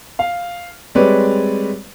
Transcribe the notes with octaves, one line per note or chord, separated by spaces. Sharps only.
F5
G3 G#3 C4 B4 C#5 D5